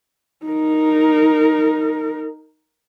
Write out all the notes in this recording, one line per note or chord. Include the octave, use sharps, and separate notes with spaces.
D#4 A#4